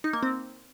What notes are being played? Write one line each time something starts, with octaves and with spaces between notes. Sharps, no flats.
D#4
A#3
C4